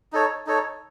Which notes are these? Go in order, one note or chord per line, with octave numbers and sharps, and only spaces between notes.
D#4 A4 C#5
D#4 A4 C#5